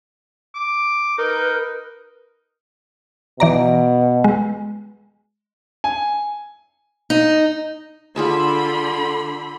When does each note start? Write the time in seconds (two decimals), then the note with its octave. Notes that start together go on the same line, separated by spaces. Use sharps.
0.55 D6
1.18 D#4 A#4 B4
3.40 B2 E3 D5 A#5
4.24 G#3
5.84 G#5
7.10 D#4
8.16 D3 F4 G#4 E5 B5 C6